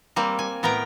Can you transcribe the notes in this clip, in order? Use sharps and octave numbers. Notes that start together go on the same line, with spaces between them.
G3 A#3 C4
G#5
A2 B3 A#4 G5 A#5